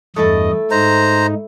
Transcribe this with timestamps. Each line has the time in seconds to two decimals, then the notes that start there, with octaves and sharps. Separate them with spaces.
0.16 E2 G2 A3 E4 A4 D#5
0.71 G#2 D#4 C5 A#5